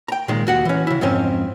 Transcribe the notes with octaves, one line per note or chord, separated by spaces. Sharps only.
G5 A#5
A#2 D#3 G#3
D#2 F#4 F#5
E3 C#4
C#3 E4
F2 G#2 C4 C#4